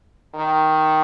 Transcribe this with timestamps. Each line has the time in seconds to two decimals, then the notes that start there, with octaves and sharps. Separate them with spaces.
0.35 D#3